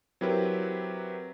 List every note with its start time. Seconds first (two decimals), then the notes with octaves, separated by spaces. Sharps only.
0.21 F#3 C4 E4 G4 A#4 B4